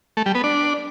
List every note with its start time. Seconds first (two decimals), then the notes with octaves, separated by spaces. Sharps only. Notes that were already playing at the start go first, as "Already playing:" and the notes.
0.17 A3
0.26 G3
0.35 B3
0.44 D4